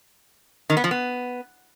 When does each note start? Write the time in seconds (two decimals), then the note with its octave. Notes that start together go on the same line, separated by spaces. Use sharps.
0.70 D#3
0.77 B3
0.84 F3
0.91 B3